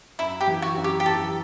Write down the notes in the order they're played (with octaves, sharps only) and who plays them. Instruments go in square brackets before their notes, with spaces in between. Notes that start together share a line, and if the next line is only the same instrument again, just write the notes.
[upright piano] F#2 [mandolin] E4
[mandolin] G4
[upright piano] E3
[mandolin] F#4
[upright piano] F#2
[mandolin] G4
G4
[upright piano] E3 [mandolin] A4